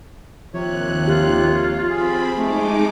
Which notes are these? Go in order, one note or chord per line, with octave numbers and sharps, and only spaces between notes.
D#2 C3 F3 C#5 F#6
F4 G4
C4 G#4 B5
G#3 A3 D#4 D6